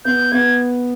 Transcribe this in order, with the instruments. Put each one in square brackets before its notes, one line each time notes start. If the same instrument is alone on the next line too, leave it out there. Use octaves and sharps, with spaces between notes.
[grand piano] B3 [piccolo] G6
[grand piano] B3 [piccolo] G#6